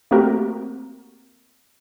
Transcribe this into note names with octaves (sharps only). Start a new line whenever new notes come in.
A3 A#3 C4 F#4 G4 A#4